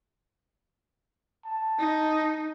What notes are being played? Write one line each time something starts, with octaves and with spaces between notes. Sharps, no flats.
A5
D#4